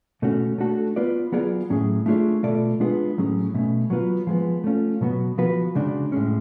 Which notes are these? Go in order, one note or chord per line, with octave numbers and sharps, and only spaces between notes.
B2 A3 C#4 F#4
A3 D4 F#4 A4
B3 F4 B4 D5
F#3 B3 F4 G#4 D5
A2 F#3 C#4 G#4
A3 D4 F4 G#4 C#5
B2 A3 F4 A4 D5
G#3 B3 D4 F4 G#4
A2 F#3 C#4 G#4
B2 A3 C#4
F#3 B3 F4 B4
F3 G#3 B3
A3 C#4 F4
B2 F#3 B3 F#4
F3 B3 F#4 B4
C#3 G#3 D4 F#4
A2 G#3 C#4